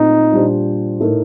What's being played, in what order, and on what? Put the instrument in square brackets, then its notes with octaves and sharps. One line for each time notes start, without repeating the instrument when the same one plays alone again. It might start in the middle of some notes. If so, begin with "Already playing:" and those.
Already playing: [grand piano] A#2 A3 C4 [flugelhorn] D#4
[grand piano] A#2 G3 D4 G4 C5
A2 A3 D#4 A#4